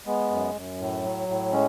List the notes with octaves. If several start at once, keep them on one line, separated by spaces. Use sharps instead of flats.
G#3 B3
F#2
F#2
A2
F#3
A2
G#3 C#4